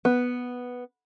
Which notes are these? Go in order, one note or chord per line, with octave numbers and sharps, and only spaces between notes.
B3